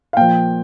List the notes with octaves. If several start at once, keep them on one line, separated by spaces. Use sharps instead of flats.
F5
A#2 F3 G5